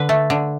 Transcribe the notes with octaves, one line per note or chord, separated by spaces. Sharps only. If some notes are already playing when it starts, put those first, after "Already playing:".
Already playing: D3 B4
A3
D3